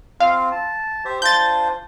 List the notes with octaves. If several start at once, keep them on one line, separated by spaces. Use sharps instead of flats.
C4 F4 F5
A5
G4 C5 E5
D4 F4 C5 G6 A6